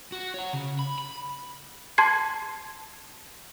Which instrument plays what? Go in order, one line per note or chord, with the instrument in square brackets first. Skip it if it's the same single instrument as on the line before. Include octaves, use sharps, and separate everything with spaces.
[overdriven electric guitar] F#4
C#5 F#5
C#3
B5
B5
[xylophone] A5 C6 G#6 C7